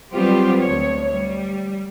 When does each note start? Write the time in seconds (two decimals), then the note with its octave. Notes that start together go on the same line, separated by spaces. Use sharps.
0.13 F#3 G3 B3 C4 F4 G4
0.60 D2 C#5
1.11 G3